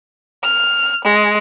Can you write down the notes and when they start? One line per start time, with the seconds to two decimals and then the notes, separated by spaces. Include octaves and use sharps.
0.44 F6
1.05 G#3